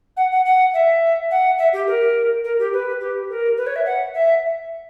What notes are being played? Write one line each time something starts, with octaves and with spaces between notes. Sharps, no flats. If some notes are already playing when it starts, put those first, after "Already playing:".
F#5
F#5
F#5
E5
F#5
E5
G4
A#4
A#4
G4
B4
G4
A#4
B4
C#5
E5
F#5
E5